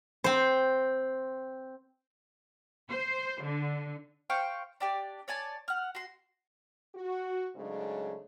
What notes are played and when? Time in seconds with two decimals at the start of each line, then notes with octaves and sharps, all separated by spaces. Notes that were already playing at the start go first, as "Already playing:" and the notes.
0.24 C4 C5
2.90 C5
3.43 D3
4.30 C5 F5 G5 C#6
4.80 D4 G4 D5
5.28 C#5 D5 G#5 A5
5.68 F#5 F6
5.95 F#4 C6
6.95 F#4
7.56 G#2 C#3 F#3 G#3 A3 D4